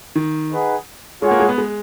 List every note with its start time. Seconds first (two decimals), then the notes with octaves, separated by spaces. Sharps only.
0.16 D#3
0.51 D#4 G#4 B4 F#5
1.21 G#3 F4 G#4 C#5 F#5
1.31 A#3
1.40 G#3
1.49 B3
1.58 G#3